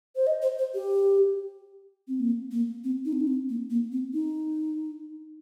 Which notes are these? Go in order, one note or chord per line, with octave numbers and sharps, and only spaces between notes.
C5
D#5
C5
C5
G4
C4
A#3
A#3
C4
D#4
C4
D#4
C4
A#3
A#3
C4
D#4